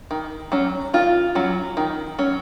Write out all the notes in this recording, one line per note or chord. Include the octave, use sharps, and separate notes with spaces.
D#3
F#3 C#4
D#3 F4
F#3 C#4
D#3
F#3 C#4